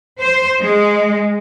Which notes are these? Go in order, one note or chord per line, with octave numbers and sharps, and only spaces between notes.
C5
G#3